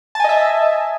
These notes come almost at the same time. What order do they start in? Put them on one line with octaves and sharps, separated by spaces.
A5 G#5 D#5 E5